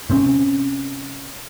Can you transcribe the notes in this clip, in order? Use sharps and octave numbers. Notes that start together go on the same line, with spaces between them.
C3 C4 C#4